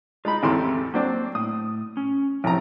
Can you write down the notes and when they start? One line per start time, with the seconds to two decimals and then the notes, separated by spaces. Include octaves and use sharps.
0.25 G#3 D#4 F4 B5
0.43 A1 E2 C4 G4 A4 C6
0.94 F#3 A#3 C4 D4
1.35 A2 D#6
1.97 C#4
2.44 A1 C3 F3 A#5